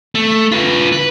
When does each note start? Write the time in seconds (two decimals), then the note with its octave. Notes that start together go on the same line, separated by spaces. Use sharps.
0.15 A3
0.52 F4 B4
0.92 B4